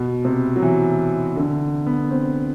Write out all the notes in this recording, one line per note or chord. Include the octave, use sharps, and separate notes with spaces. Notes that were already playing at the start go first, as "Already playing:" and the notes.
Already playing: B2
C3
F#3
E3
D3
B3
C4